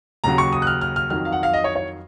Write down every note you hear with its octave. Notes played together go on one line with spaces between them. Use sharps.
D#2 C#3 F#3 A#5
C#6
D#6
F#6
F6
F6
F6
F2 D#3 F#3 F6
F5
F#5
F5
D#5
C#5
C#5